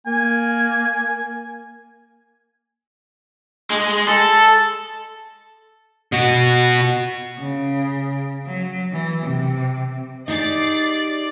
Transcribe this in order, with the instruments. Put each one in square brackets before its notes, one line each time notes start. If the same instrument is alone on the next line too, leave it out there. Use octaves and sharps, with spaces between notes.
[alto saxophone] A#3 [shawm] G#5
[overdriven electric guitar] G#3
A4
[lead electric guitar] B2 F#4
[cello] C#3
F#3
E3
C3
[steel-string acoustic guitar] D#4 G4 G#4 [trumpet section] D5 [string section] A6 C7